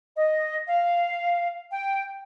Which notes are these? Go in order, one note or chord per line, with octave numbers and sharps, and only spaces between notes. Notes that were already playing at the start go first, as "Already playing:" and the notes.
D#5
F5
G5